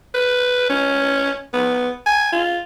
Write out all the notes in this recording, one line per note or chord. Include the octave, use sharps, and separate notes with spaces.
B4
C#4
B3
G#5
F4